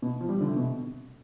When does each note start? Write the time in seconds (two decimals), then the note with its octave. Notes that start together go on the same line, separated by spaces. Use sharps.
0.02 B2
0.21 F3
0.29 G3
0.41 D3
0.48 C3
0.56 B2